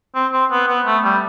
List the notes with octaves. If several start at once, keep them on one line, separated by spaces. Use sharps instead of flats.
C4
C4
B3
B3
A3
G3